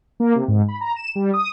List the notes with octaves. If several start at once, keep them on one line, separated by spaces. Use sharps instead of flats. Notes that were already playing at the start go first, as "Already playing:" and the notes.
A#3
C3
G#2
B5
A#5
E7
G3
D#6